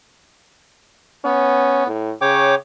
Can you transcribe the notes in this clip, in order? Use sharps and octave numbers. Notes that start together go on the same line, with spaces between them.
B3 C#4
A2
C#3 C#5 G5 D6